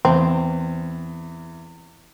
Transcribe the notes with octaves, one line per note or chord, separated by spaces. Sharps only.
E2 C4